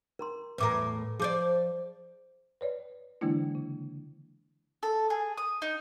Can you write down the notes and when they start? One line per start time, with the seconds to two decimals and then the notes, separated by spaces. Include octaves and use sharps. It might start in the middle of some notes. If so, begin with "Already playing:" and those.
0.19 A#4 A#5 C6
0.58 E2 A2 A#4 B4 D6
1.20 F3 G#4 C5 D5 D6
2.61 B4 C#5 D5
3.21 D3 E3 G#3 A#3 D4 E4
3.55 C#3
4.83 A4
5.10 G#4
5.37 D#6
5.62 D#4